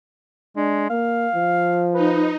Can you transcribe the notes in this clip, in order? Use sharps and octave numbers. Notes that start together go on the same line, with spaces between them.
G#3 D4
A#3 F5
F3
D#4 B4